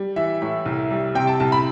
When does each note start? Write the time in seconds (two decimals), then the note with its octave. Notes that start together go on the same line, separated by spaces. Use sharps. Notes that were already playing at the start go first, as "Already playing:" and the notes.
Already playing: G3
0.16 E3 E5
0.42 A2
0.66 C2
0.91 G3
1.15 C3 G5
1.27 A5
1.40 C2 A5
1.52 B5